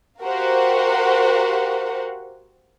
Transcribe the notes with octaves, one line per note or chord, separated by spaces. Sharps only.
F#4 G4 A#4 C5 F5 F#5